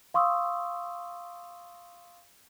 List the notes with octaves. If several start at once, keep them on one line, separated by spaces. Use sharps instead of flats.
F5 C6 C#6 D#6 E6